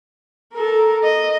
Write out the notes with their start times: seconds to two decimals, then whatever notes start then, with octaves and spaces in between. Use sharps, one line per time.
0.54 A4 A#4
1.03 D#5